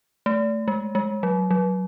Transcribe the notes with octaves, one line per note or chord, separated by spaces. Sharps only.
A3
G#3
G#3
F#3
F#3